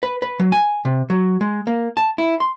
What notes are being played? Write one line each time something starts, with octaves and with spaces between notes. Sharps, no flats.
B4
B4
F#3
G#5
C3
F#3
G#3
A#3
A5
E4
C6